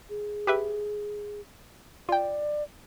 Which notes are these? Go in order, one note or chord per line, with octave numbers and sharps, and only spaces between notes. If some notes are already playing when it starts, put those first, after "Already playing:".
G#4
G4 B4 E5
F4 D5 G5